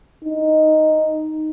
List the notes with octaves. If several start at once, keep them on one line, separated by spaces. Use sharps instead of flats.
D#4